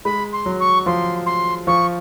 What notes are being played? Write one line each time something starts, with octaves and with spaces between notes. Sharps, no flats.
G#3 B5
C6
F#3
C#6
F3 C6
C6
F3 C#6